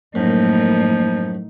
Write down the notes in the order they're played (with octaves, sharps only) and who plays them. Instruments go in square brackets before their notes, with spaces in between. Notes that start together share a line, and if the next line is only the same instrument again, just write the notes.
[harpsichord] F#2 [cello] A2 D#4 [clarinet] F3 [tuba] A#3